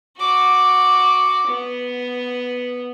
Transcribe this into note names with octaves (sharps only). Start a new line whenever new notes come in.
F#4 D6
B3